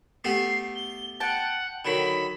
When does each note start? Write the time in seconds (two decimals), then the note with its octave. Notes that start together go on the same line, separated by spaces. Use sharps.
0.24 A3 B3 G4 C7
0.76 G7
1.20 F#5 G5 A5
1.85 D3 D#3 F#3 B5